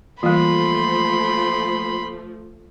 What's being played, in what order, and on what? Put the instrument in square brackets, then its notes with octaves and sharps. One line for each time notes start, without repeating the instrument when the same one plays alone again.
[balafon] E3 G3 [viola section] F3 A3 [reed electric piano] A#3 F4 [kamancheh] B5 C6